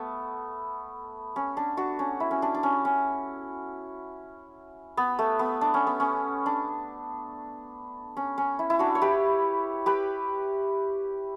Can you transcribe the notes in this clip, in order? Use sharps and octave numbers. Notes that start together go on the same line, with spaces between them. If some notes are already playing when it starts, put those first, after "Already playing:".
Already playing: A3 B3
C#4
D4
D4 F#4
C#4
E4
C#4
D4
D4
C#4
C#4
B3
A3
B3
D4
C#4
B3
C#4
D4
C#4
C#4
E4
E4
D4 F#4
C#5
G4 B4
G4 B4